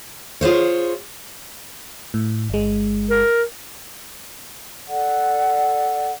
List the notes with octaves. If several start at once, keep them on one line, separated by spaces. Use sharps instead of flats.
F4 G#4 C5 C#5
A2
G1 G#3
A#4
A4 D5 F#5